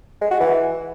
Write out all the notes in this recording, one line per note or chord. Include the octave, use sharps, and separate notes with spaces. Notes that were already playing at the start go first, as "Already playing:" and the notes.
G#3
F#4
E3